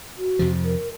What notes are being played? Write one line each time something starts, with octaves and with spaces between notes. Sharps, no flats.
F#4
F2 C3 F3
A#4